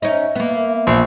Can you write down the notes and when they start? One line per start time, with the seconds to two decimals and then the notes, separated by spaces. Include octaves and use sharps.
0.02 C#4 D#4 E5
0.36 A#3 B3
0.87 A#1